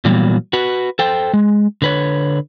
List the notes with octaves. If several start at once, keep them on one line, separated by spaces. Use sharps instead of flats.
A#2 E3 F#3 G3 A#3 B3
F#4 B4
A4 C5 G5
G#3
D3 B4 C#5